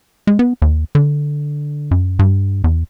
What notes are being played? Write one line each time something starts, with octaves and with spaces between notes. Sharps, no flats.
G#3
B3
D#2
D3
F#2
G2
E2